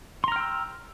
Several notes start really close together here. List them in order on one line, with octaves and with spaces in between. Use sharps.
C6 A#5 F6 G5 E6